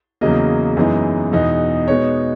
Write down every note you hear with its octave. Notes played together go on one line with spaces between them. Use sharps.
E2 C#3 F#3 A#3 D#5
F#2 E3 G#3 B3 D#4
E2 B2 G#3 B3 D#4
B2 G#3 B3 D#4 C#5